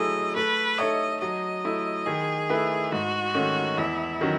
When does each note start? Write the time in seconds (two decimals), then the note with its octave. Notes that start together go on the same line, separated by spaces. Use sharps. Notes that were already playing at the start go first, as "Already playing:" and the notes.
Already playing: F#3 A3 E4 G#4 D#5
0.36 A3 B4
0.78 D#4 A4 C#5 D#5 E5
1.21 F#3 D#5
1.65 A3 E4
2.06 D#3 G#4
2.50 A3 E4 B4 E5
2.92 G#2 F#4
3.35 D#3 A3 C#4
3.77 E2 E4
4.21 D#3 F#3 C#4